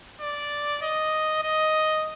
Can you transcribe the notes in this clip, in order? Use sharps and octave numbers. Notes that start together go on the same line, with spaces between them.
D5
D#5
D#5